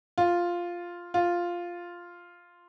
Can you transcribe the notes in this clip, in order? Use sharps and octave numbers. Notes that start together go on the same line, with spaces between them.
F4
F4